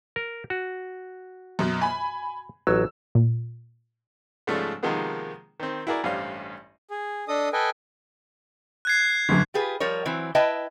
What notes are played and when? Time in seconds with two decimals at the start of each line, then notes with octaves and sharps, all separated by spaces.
0.16 A#4
0.50 F#4
1.59 F#2 B2
1.82 G#5 B5
2.67 A1 F#3 E6
3.15 A#2
4.47 G#2 C#3 F3 G3 A3
4.83 C3 D#3 F3 G#3 A#3 B3
5.60 D#3 C4
5.87 E4 F#4 G#4 A#4 D5
6.03 A1 G2 D4 C5 F5
6.89 G#4
7.28 D4 A4 D#5 D#6
7.53 A4 B4 D#5 G5 G#5
8.85 F#6 G#6 C7
9.29 G1 F#2
9.54 F4 G4 G#4 B4
9.80 F3 G3 A#4 C#5
10.05 E3 F#3 C4
10.35 E4 B4 D#5 E5 G5 A5